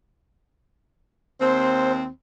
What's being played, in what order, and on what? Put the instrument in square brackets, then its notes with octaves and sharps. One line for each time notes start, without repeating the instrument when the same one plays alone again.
[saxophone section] D#2 C4 [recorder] C5